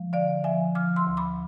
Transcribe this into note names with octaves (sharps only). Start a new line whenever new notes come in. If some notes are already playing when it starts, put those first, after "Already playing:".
Already playing: F3 G#3
D3 D5 F5
F3 E5 G#5
F3 D6 F6
C6 E6
D2
B5 D6